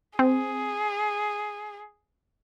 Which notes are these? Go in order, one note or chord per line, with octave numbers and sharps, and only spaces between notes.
C4 G#4